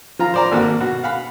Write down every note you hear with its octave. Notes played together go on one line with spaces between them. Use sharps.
F3 F4 A#5
C5 D5 A#5
G#1 A#3 F#4
B2 F#4
F5 F#5 B5